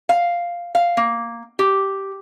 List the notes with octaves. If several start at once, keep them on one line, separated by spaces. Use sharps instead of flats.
F5
F5
A#3
G4